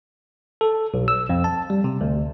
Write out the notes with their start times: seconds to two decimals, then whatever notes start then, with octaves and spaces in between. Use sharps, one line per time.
0.61 A4
0.94 B1
1.08 E6
1.29 F2
1.44 A5
1.70 G3
1.84 C3
2.01 D2